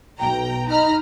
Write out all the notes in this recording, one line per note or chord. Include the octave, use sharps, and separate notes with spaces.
B1 G5 A#5
D#4 A#5 B5 F6